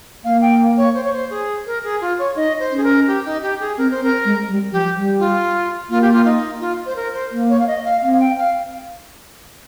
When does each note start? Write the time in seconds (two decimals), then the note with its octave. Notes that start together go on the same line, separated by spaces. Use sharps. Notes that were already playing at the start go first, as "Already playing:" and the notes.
0.24 A#3 F5
0.41 G5
0.77 C#5
0.95 C5
1.04 C#5
1.12 C5
1.30 G#4
1.66 A#4
1.84 G#4
2.01 F4
2.19 C#5
2.36 D#4 D#5
2.60 C5
2.71 C#4
2.77 G#4
2.84 A#4
3.07 G4
3.25 D#4
3.42 G4
3.60 G#4
3.78 C4 A#4
3.91 C5
4.01 C4
4.03 A#4
4.25 G#3
4.48 G3
4.72 F3 G4
4.96 G3
5.19 F4
5.90 A#3 F4
6.02 G4
6.13 F4
6.25 D#4
6.60 F4
6.86 C5
6.96 A#4
7.13 C5
7.31 A#3
7.49 C#5
7.59 F5
7.67 D#5
7.85 F5
8.02 C4 F5
8.13 F5
8.20 G5
8.38 F5